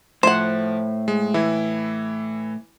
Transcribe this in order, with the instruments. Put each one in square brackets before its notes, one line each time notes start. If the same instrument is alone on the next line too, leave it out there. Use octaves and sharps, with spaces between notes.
[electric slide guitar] A2 [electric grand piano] F3 [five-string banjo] C5 F#5
[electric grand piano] G#3
E3 E4